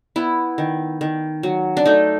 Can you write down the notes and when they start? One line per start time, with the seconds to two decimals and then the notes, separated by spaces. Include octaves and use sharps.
0.16 B3 E4
0.58 D#3
1.01 D#3
1.43 F#3
1.77 D4
1.86 A3 D#4